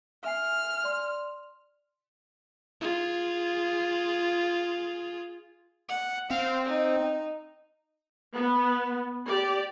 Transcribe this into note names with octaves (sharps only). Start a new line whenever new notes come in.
E5 G#5 F6 C7
D5 C6
F4 G#4
F#5
C4 F5
D#4
B3
G4 D5